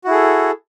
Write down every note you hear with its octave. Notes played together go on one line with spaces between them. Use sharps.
E4 F#4 G#4 A4